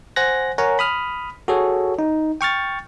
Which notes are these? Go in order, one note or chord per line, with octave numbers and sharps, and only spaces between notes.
C5 F#5 G#5 F#6 A#6
A#4 C#5 F#5 G#5 A#5
B5 D#6 F6
F#4 G#4 A4 C#5
D#4
G5 C#6 F6 A6